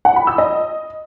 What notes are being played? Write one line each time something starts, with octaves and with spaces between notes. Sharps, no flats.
F#5
B5
E6
D#5